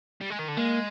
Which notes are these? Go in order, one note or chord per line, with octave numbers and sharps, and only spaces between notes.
G3
G#3
D#3
D3
G#3 A#3